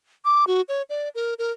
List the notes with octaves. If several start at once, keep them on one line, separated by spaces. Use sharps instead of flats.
D6
F#4
C#5
D5
A#4
A#4